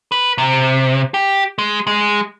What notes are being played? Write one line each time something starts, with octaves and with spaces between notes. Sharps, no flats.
B4
C3
G4
G#3
G#3